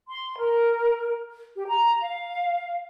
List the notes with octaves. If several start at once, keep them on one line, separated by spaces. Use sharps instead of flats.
C6
A#4
G4
A#5
F5